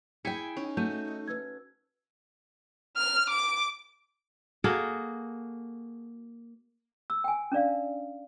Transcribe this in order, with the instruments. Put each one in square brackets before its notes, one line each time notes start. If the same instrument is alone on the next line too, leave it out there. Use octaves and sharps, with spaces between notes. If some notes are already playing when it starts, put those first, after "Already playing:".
[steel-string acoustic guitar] E4 G5 [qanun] G#4 G#5 [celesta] B6 C#7
[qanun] C#4 [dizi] D#4
[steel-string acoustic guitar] A3 [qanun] F#4 [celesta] G6 D#7
[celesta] B4 E6 G#6
[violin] F6
D6
[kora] A#3 F#4 G#4 A4
[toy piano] E6
G5 G#5
C#4 D4 D5 F5